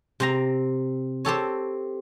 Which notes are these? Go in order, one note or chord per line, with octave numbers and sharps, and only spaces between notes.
C3 C4 A#5
C4 G4 A4 C#5